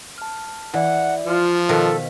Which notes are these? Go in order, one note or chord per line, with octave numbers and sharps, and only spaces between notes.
A5 F6
E3 E4 D5 E5 F#5
F3 F4
B2 D#3 A4 A#4 C5 F5 B6